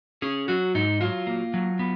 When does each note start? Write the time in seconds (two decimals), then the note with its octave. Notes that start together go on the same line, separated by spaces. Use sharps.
0.22 C#4 G#4
0.48 F#3 F#4
0.75 G#2 D#4
1.01 F#3 F4
1.27 A#3
1.54 F#3
1.79 B3